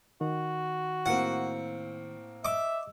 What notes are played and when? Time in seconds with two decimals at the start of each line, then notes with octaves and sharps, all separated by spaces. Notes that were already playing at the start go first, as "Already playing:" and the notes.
0.21 D#3 F#4
1.06 A2 A#3 C4 F#5
2.45 D#5 E5 D6 E6